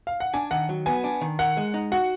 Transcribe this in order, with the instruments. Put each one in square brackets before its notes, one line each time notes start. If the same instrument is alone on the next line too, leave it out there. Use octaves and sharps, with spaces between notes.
[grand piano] F5
F#5
[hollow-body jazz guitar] D4 [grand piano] G#5
[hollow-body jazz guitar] D#3 [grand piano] F#5
[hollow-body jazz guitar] F#3
[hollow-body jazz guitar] B3 [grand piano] G#5
[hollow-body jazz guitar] D4
D#3
[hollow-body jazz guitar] A#4 [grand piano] F#5
[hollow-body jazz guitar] G#3
D#4
[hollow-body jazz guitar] F#4 [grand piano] F#5